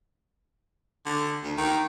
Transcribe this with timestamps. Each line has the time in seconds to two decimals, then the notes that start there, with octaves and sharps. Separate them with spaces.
1.06 D3
1.43 D2
1.57 D#3